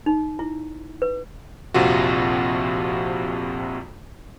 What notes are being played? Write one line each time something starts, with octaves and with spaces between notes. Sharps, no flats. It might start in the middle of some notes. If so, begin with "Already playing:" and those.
D#4
E4
B4
A#1 F2 C3 F4 F#4